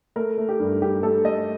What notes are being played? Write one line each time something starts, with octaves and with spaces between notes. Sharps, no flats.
A3 A#4
A3
G4
G2
G2 G4
A3 A4
A3 D#5